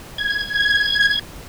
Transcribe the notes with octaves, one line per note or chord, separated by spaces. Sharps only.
G#6